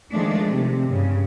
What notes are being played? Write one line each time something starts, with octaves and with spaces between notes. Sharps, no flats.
D#3 F3 G#3 A3 D4
C3
G2 C#3